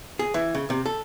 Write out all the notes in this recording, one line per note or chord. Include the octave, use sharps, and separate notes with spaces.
G#4
E3
C#3
C3
A4